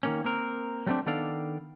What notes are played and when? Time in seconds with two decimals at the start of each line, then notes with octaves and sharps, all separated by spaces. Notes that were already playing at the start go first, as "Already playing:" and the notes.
0.03 D#3 A#3 C#4
0.24 A#3 C4 A#4
0.86 F#3 G3 A3 A#3 C4 D4
1.06 D#3 B3 D4 A4 D5 F5